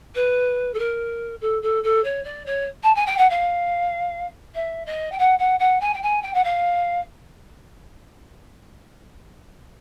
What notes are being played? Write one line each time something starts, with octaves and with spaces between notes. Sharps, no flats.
B4
A4
A#4
A4
A4
A4
C#5
D5
C#5
A5
G#5
G5
F#5
F5
E5
D#5
G5
F#5
F#5
F#5
G#5
G5
G#5
G5
F#5
F5